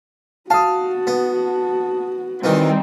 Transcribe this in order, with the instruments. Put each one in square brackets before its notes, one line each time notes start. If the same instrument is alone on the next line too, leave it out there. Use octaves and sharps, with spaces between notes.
[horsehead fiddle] F#4 [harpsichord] F5 [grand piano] A5 D#6
[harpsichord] B3
[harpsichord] D#3 E3 [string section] G3 C4 D#4